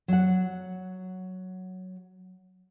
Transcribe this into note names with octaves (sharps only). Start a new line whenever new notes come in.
F#3 F#5